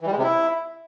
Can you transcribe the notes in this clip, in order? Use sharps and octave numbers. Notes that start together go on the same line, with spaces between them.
E3
G3
G#3
C3
E4